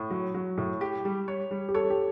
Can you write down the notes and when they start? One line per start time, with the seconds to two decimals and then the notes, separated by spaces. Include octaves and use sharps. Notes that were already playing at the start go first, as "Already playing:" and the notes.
Already playing: A2
0.10 F#3
0.34 F#3
0.57 A2
0.81 G4
1.05 G3
1.28 C#5
1.51 G3
1.69 G4
1.74 A4 C#5
1.90 G4